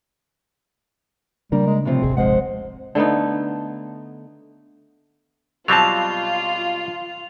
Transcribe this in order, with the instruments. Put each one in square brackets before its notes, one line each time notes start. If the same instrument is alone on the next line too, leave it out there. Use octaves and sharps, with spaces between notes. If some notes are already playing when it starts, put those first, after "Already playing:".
[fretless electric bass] C#3 A#3 D4 [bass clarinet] G3 [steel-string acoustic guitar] A#4
[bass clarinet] G#3
[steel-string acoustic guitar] A2 C3 F3 [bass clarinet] C4
[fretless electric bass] D#1 G#1 C3 [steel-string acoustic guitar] G#4
[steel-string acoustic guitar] F3 C5 F#5 [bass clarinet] G#3
[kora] D3 A3 B3 D#4
[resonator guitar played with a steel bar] B2 A5 [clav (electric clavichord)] F#3 G3 C4 [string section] F4 [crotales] F7